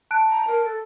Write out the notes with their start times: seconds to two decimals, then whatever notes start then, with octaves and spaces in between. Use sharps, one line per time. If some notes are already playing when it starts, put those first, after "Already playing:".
0.11 A5 F#6 D7
0.29 A#5
0.48 A#4
0.65 A4